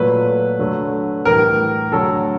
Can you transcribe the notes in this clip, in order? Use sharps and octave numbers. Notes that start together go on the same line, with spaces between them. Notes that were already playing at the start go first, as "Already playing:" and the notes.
Already playing: A#2 F#3 A3 B4
D3 F#3 A3
A2 E3 G3 A#4
D3 F#3 A3 A4